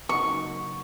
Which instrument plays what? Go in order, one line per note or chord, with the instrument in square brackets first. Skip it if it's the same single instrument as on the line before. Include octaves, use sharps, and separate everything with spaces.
[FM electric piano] C#3 F#3 A#3 D#4 F#4 [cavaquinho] C#6